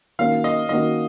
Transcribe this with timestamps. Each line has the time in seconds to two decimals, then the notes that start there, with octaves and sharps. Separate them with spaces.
0.19 D#3 A#3 C#4 F#4 A#4 F5
0.44 D#5
0.69 D#3 A#3 C#4 F#4 A#4 D#5